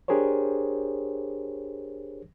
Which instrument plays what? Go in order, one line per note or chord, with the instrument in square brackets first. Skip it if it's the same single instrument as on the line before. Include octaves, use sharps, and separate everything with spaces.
[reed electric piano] D4 G4 G#4 A#4 C5 C#5